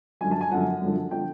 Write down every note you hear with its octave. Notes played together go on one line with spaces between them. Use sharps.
F#2 D3 F3 G#5
A5
G#5
F#2 D3 F3 F#5
F#2 D3 F3
D3 F3 G5